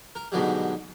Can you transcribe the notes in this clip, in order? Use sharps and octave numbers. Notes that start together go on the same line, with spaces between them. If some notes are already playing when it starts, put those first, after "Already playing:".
A#4
G#2 B2 D3 F#3 G3